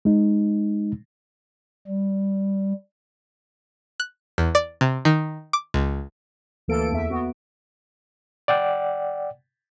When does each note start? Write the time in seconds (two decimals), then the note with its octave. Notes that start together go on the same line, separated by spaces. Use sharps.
0.05 G#3 D#4
1.88 G3
4.00 F#6
4.38 E2
4.55 D5
4.81 C3
5.05 D#3
5.53 D6
5.74 C#2
6.68 D2 E3 A#3 A4 D7
6.92 E2 E5
7.10 B3 F#4
8.48 D5 F#5 G5